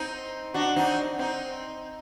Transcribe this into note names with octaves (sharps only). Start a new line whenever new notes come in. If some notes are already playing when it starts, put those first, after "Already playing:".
Already playing: C4 D#4
D4 F#4
C4 D#4
C4 D#4